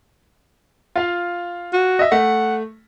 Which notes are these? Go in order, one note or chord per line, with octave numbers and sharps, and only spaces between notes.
F4 F5
F#4
D#5 E5
A3 F#5